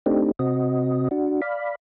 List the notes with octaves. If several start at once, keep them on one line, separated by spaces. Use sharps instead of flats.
A3 C4 D4 D#4 G4
C3 C4 F#4 D#5
D4 F#4
D5 F5 B5